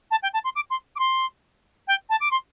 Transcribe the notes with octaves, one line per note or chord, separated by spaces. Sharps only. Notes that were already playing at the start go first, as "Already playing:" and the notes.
A5
G5
A5
C6
D6
C6
D6
C6
G5
A5
D6
C6